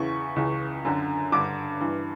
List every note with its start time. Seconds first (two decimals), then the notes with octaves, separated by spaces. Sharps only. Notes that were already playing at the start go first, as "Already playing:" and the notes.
Already playing: E2 C#3 E3 C#6
0.36 C#2 C#3 E3
0.85 F#2 D3
1.32 G2 D3 D6
1.81 G2 E3